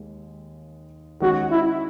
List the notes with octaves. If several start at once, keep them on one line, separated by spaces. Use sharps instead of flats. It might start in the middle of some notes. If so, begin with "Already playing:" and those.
Already playing: D#2 G#3
D#3 G#3 C#4 F#4 G#4
E4